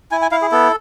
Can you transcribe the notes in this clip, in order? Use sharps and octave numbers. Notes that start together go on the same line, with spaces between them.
E4 G#5
G#5
E4 F5
G#4
B3 A4